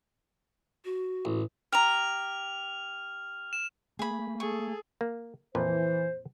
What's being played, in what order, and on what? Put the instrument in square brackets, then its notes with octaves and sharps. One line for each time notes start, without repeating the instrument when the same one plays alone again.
[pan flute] F#4
[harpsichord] A1
[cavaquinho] G4 A#5 [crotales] F6 F7
[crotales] E7
[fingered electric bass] A3 A#3 [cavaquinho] G#4 B5
[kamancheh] G#4 A4 [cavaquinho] C#6
[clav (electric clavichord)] A#3
[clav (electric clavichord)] F2 A#2 B4 [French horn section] E3 [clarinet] C5